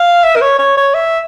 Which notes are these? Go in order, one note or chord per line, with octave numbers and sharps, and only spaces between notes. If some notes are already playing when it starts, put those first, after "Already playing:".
Already playing: F5
E5
A#4
C#5
C#5
C#5
E5